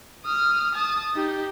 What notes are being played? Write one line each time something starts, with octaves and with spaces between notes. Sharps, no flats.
D#6 F6
A5 D#6
D#4 G4